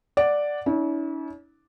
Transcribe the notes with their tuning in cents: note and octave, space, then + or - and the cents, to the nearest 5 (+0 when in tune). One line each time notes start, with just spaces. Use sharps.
D5 +0 F#5 +0
C#4 +45 E4 -40